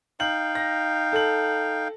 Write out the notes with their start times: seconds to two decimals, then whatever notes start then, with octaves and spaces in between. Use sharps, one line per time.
0.20 D#4 F5 G5 F#7
0.55 A#6
1.12 A4 F#7